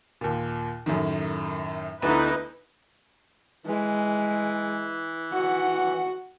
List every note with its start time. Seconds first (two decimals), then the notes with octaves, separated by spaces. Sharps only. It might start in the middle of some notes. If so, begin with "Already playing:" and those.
0.21 D#2 A#2
0.86 F#2 A2 D#3
2.02 D2 A3 B3 D#4 E4 B4
3.66 E3 G#3
5.32 F#4 F#5